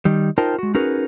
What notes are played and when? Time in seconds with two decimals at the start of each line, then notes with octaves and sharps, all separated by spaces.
0.05 D#3 G3
0.38 D#4 F4 A#4 C5 G5 A5
0.59 G#3 F#4
0.75 C#4 D#4 F#4 G#4 A#4 B4